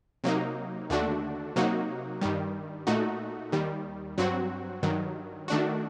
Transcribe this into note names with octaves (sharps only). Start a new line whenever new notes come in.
C3 F#3 A#3 D#4
D#2 D3 A3 D4 F#4
C3 F#3 A#3 D#4 F#4
G2 D#3 G3
A#2 A3 D#4 F#4
D#2 D#3 G3
G2 F#3 C4 F#4
G2 D#3 F#3
D#3 A3 D4 F#4